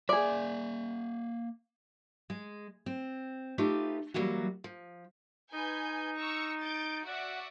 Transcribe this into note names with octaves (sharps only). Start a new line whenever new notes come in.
A#3 G#4 D5 E5
G#3
C4
A3 D#4 F4 G4 B4
E3 F#3 G3 A#3 F#4
F3
D#4 B4 G#5 G6
A#5 C#6 E6
G6 A6 D7
F#4 D5 E5 F#5